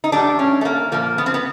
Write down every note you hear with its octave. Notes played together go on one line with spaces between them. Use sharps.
D#4
A2 E3 G3 D4
C#4
A3
A#3
A#2 F3 A#3
B3
C4
B3